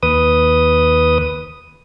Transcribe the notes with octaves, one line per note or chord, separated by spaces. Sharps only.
D#2 B4 D#6